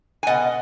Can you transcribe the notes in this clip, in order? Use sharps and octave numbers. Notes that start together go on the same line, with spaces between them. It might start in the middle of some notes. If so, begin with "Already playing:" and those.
G#5
B2 D#5 F#5